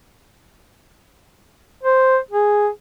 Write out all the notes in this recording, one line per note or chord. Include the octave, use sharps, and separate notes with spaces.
C5
G#4